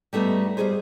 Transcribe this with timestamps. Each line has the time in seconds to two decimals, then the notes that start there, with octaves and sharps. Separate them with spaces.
0.13 G3 A3 B3 D#4
0.57 G3 G#3 F#4 G#4 C5